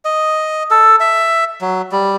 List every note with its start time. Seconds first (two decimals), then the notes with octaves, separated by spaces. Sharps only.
0.05 D#5
0.71 A4
1.00 E5
1.61 F#3
1.92 G3